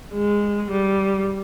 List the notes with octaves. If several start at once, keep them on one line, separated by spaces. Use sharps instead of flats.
G#3
G3